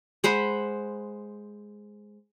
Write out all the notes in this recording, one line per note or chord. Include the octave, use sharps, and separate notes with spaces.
G#3 C5 F#5 B5